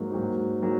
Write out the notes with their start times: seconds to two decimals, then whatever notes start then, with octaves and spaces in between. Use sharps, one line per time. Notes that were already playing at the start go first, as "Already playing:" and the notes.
Already playing: G#2 F#3 A#3 D#4
0.11 G#2 F#3 A#3 D#4
0.62 F#3 A#3 D#4